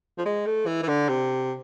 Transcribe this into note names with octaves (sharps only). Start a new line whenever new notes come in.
F3
G#3
A3
E3
E3
D3
C3